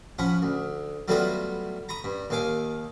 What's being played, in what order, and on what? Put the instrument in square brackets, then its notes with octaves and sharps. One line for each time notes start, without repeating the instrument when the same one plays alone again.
[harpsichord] F3 C#4 F#5 B5
D2
F#3 G3 A3 B3 F4 F#4
A#5 B5 C#6 D#6
G2
D#2 D#3 F5 G#5 D6